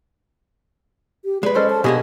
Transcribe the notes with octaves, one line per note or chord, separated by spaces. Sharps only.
G4
G#3 B4 D5
C#4 A4 C5 D#5
A5
B2 D3 A#3 G4 G#4 D#5